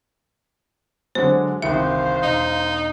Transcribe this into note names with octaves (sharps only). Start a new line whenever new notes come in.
D3 F#3 G#3 C5
G1 C2 D#3 C5 E5 F5
E1 D#4